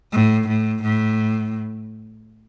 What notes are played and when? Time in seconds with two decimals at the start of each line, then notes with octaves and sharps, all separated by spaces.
0.13 A2
0.48 A2
0.82 A2